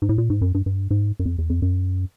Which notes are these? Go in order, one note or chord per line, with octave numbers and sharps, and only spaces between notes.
G#2
A2
A#2
G#2
F#2
G2
G2
G#2
F#2
F2
E2
F2
F#2